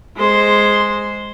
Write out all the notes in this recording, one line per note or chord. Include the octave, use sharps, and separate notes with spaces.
G#3 C5